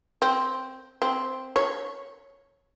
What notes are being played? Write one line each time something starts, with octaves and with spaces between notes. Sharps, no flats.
C4
C4
C#5